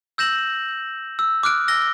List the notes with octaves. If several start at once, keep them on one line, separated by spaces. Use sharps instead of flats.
E6 G6 A#6 E7 F#7
E6
D6 F6 F#6 D7
E6 A#6 G7